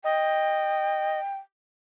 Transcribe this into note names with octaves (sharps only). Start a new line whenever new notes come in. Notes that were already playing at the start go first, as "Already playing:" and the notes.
D#5 G5